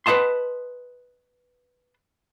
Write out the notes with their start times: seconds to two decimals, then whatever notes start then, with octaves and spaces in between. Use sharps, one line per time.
0.06 B4 C5 D#5 A5 C6